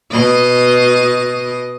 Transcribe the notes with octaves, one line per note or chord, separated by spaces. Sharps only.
B2 D#5